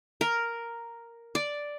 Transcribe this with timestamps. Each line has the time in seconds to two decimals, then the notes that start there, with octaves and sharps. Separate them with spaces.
0.21 A#4
1.35 D5